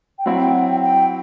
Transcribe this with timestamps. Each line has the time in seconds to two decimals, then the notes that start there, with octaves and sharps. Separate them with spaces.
0.19 G5
0.26 F#3 C4 E4 F#5
0.40 G5
0.53 F#5
0.68 G5
0.77 F#5
0.82 G5